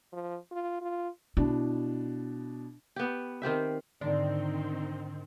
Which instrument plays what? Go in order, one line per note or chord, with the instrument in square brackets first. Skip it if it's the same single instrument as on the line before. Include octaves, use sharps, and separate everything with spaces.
[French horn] F3
F4
F4
[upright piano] B2 D4 [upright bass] E4
[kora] B3 G4
D#3 C4 G4 E5
[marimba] G#2 D3 [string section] D#3 C4 [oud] D4